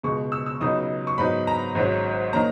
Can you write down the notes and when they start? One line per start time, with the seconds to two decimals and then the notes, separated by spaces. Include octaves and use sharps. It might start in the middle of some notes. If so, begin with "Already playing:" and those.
0.03 C#2 B2 G#3 C#6
0.32 E6
0.46 E6
0.61 C#2 C#3 F#3 B3 D#4 D#6
1.07 C#6
1.18 G#2 F#3 B3 D#4 B5
1.47 A#5
1.75 G#1 G#2 F#3 C#4
2.33 D#3 A#3 C#4 A#5